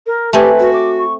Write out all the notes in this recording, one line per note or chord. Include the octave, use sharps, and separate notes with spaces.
A#4
A3 C4 G4 B4 G#5
F#4
D6
C#6